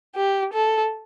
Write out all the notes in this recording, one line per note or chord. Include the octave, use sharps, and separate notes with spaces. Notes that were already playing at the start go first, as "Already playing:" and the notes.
G4
A4